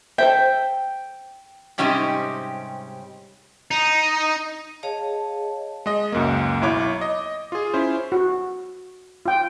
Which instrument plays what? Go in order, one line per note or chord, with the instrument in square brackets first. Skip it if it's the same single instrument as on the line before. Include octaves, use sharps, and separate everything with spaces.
[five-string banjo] A4 C5 E5 [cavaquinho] G5
[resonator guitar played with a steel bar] G#2 C3 G3 C#4 D#4 G4
[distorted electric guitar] D#4
[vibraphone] G#4 C#5 D#5 F5 A5
[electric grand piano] G#3 D#5
C#2 F#2 A#3
B1 E4 C#5 D6
D#5
F4 G#4
C#4 E4 C5
[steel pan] F#4
F4 G5